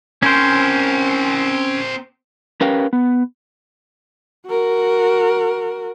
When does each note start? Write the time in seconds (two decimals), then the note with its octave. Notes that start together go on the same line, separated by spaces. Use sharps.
0.23 C4 C#4 A#4 C5
2.61 C#4 G4 A#4 B4 F5 G5
2.93 B3
4.47 F#4 A#4